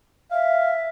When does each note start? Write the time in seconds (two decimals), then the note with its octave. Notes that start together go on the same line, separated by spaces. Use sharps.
0.31 E5 F5